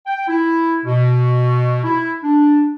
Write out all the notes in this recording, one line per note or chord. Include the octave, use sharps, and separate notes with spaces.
G5
E4
B2
E4
D4